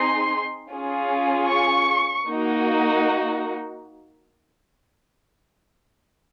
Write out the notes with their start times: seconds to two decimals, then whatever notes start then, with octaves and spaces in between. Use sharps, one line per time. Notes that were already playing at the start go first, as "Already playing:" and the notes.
Already playing: C4 D#4 G#4 C6
0.70 C#4 F4 G#4
1.49 C#6
2.27 A#3 D#4 F#4